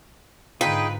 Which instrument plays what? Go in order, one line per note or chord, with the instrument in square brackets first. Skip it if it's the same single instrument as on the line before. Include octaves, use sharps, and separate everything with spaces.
[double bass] G#2 D3 [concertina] D#4 G#4 G5 [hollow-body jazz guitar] F4 [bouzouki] B4